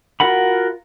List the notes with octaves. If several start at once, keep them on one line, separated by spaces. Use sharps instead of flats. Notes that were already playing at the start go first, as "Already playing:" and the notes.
F4 F#4 A#4 F#5 B5